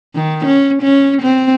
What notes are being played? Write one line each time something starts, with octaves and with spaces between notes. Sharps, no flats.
D#3
C#4
C#4
C4